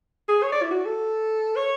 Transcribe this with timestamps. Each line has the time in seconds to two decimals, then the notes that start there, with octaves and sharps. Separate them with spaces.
0.29 G#4
0.43 C#5
0.52 D5
0.62 E4
0.71 F#4
0.86 A4
1.56 C#5